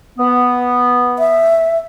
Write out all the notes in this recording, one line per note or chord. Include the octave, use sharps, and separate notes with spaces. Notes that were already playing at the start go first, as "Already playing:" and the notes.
B3
E5